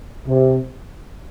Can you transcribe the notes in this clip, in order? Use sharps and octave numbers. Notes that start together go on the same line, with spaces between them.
C3